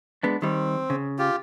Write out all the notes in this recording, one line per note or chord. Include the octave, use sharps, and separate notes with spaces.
G#3 B3 D4
D#3 G3 C4
C#3
F4 G4